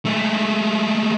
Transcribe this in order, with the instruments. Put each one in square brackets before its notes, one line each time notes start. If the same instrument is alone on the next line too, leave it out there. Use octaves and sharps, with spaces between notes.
[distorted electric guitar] G#3 A3